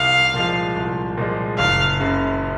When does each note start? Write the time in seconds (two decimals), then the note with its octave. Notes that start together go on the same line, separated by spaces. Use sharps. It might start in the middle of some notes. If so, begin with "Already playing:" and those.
Already playing: C2 F5
0.34 A#2 F3 G#3
0.76 C2
1.18 A#2 F3 G#3
1.59 F#1 F5
2.00 F#2 C#3